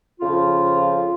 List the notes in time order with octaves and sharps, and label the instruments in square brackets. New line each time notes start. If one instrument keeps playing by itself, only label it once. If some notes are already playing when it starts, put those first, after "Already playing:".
[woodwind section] F2 C#3 F3 F4